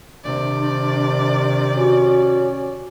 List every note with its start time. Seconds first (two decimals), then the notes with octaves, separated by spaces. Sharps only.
0.25 C3 D#3 D4 D5
1.76 C#4 F#4